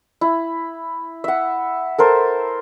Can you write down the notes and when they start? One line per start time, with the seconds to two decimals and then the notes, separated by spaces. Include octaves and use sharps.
0.21 E4
1.24 E5 F#5
1.98 A4 A#4 C5